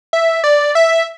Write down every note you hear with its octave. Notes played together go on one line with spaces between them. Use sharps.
E5
D5
E5